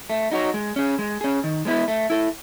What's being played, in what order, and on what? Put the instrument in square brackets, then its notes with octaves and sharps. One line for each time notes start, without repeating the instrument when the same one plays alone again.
[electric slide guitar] A3
D#4 F#4 C#5
G#3
C#4 G#4
G#3
C#4 G#4
D#3
G#3 B3 E4 B4
A3
E4 A4